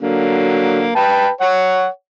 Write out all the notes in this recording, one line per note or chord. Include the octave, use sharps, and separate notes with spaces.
D3 F#3 A#3
B4 G5 A5
C#5 F#5